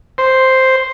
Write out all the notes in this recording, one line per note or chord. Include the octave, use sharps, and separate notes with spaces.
C5